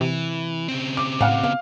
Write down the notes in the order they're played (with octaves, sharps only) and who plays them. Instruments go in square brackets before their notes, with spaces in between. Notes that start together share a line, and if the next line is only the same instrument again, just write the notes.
[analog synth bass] C3 [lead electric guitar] E3
[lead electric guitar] C#3 C4
[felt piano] D6
[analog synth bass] A2 [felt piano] F5 F#5 F6
[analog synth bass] B2 [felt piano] F5